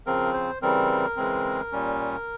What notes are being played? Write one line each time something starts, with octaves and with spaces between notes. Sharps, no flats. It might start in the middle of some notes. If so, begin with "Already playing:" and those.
C#3 F3 C4 A#4
C5
C#3 E3 G3 C4 A#4
C#3 E3 G#3 C4
A#2 G3 C#4